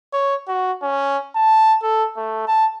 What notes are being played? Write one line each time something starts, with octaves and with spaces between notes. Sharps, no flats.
C#5
F#4
C#4
A5
A4
A3
A5